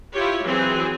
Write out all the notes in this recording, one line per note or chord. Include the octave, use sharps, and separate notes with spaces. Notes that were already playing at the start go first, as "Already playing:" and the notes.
E4 F4 G4 C#5
E3 F#3 C4 G#4